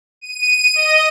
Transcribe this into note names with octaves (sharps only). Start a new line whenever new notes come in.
D#7
D#5